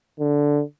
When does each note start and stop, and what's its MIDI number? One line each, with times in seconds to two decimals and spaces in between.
0.20 0.62 50